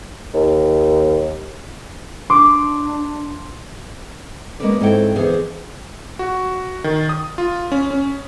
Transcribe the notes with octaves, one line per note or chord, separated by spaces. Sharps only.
D#2
D4 C6 D6
G#3 A#3 B3 C#4 B4 D5
G#2 C4 E4 A4 C#5 G5
F2 D3 E3 B3 G#4 C5
F#4
D#3
D#6
F4
C#4
C#4